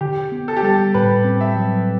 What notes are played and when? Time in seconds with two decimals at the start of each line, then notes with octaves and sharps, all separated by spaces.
0.01 D3 G4
0.32 B3
0.48 A4
0.57 G4
0.63 G3 A4
0.94 A2 B4
1.25 C4
1.41 E5
1.56 F#3